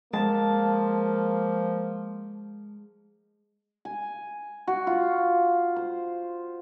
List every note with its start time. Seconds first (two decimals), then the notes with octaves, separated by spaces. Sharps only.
0.13 F3 G#3 A#3 A5
3.85 G#5
4.67 F#4
4.87 F4
5.76 C5